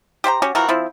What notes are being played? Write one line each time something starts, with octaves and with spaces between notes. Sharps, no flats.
G4 C5 G5 A#5
C#4 F#4 G4
E3 F3 F#4 A#4
F3 C4 E4